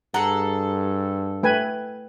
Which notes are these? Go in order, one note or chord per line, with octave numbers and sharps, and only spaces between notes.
G2 G#4 A4 F#5 A#5
A3 B4 G5 G#5